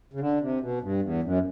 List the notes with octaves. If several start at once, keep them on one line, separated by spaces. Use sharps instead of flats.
C#3
D3
C3
B2
G2
E2
F#2